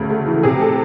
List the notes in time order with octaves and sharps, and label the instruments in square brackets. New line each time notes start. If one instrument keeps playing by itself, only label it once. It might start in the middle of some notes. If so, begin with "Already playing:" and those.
Already playing: [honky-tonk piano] D2 C#3
A3
E3
C3 G#4
A4